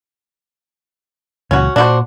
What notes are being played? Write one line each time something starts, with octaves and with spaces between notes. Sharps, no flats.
C#2 A#2 E3 C#4 F#4
A#2 D4 F#4 C5